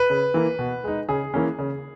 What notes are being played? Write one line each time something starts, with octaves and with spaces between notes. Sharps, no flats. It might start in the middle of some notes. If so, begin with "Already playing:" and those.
Already playing: B4
C#3
E3 A#3
B2
G#3 D#4
C#3 G#4
E3 A#3 C#4
C#3